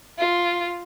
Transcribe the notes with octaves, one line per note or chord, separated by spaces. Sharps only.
F4